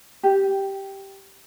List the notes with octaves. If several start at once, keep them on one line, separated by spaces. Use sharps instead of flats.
G4